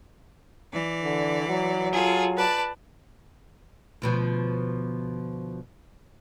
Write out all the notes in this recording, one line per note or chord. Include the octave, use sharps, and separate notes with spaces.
E3 D5
D3
F#3
F4 G#4 A4
B4 D5 A5
D2 B2 F3